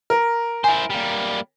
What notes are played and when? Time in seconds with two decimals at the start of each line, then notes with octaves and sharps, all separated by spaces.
0.10 A#4
0.64 E4 C5 G#5
0.90 G3 A#3